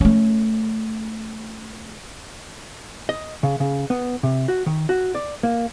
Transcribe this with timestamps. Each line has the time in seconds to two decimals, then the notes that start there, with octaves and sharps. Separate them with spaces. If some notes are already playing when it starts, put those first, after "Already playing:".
0.01 A3 C#4
3.09 D#5
3.43 C#3
3.60 C#3
3.90 B3
4.23 C3
4.48 F#4
4.66 D#3
4.89 F#4
5.15 D5
5.43 A#3